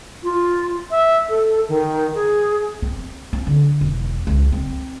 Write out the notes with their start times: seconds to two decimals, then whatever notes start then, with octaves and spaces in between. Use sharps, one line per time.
0.24 F4
0.91 E5
1.29 A4
1.68 D#3
2.15 G#4
2.82 C4
3.33 C4
3.47 D3
3.81 E1
4.27 C#2
4.52 C4